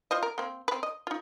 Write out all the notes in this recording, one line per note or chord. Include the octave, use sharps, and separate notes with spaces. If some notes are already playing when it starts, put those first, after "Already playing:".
F4 C5 D#5
A#4
A#3 C4
C4 B4
D#5
D#4 F4